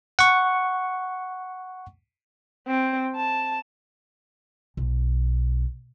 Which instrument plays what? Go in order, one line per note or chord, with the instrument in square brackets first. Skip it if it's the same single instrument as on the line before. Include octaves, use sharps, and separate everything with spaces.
[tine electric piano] F#5 C#6
[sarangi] C4
A5
[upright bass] B1